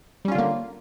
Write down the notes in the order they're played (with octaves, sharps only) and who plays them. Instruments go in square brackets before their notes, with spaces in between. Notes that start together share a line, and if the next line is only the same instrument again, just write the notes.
[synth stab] G3
C#4
F4
D3
A#3